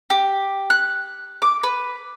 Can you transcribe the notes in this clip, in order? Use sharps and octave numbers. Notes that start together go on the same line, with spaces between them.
G4
F#6
D6
B4